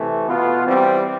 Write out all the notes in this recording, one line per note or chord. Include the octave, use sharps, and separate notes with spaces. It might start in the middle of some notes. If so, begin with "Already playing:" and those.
Already playing: C3 E3 A3
B2 B3 F4
E3 G3 C4